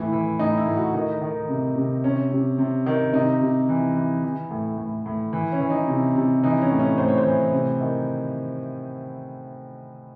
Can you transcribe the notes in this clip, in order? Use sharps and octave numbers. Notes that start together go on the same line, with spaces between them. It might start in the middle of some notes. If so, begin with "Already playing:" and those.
Already playing: A2 E3 E4
E3
A2 D#4
E4
A2
F#4
D#3 D#4
D#3
C3
C3
C3 C#4
C3
C3
D#3
C3 D#4
C3
E3
E3
E3
A2
A2
A2
E3
C#4
E3
D#4
C3
C3
E3 D#4
C#4
A2
C#4
A2 C5
C#5
C5
E3
C3
D#3